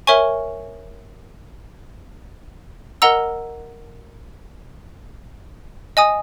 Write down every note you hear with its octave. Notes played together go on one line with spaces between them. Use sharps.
A#4 C#5 E5 G#5 C#6
A#4 D#5 F#5 A#5 E6
D#5 G#5 D#6